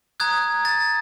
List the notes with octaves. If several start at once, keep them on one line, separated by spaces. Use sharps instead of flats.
A#5 D#6 F#6 G#6
A6